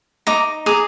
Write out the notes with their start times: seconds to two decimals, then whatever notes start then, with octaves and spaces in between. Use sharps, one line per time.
0.27 D#4 A#5 D6
0.66 G#4 A#5 D6